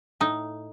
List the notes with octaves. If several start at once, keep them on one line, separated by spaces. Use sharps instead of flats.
A2 D#4